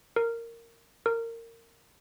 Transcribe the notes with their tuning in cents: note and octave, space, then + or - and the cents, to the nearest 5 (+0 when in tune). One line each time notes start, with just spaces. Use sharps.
A#4 -15
A#4 -25